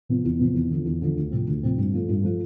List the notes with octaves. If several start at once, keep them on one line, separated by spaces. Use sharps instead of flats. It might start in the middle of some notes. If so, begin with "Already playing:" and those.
C3 F3 B3
E2
C3 F3 B3
E2
D3 F3
E2
D3 F3
D2
C3 F3 C4
D2
C3 F3 C4
G2
F3 A3
G2
F3 A3